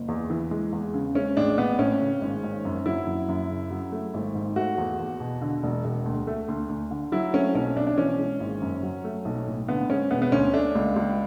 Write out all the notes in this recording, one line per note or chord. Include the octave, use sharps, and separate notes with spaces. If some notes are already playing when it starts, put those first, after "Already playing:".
Already playing: F#1
E2
E3
G#3
E2
C#3
G#3 C#4
A1 D4
A1 B3
A2 C#4
C#3
G#1
G#1
F#2
F#3 E4
F#2
F#2
C#3
F#3
A3
G#1
G#2
A3 F#4
E2
E2
B2
D3
E1
E1
D2
A3
D2
D2
D3
F#3 E4
A3 C#4
B1 C#4
B2 D4
D4
E3 C#4
G#3
G#1
F#2
F#3
A3
B1
A2
D3 B3
G#3 C#4
E1 B3
B3
D2 C#4
A3 D4
C#2
C#2